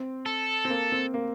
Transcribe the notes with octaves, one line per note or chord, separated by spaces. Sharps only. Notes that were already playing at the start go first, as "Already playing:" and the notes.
Already playing: C4
A4
C4
A#3
C4
A#3